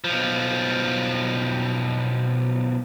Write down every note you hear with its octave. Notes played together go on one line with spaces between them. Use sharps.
B1 F3